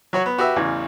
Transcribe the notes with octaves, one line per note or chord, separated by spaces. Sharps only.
F#3 F#4 C#5
B3
F#4 G4 B4 E5
A1 E2 C#3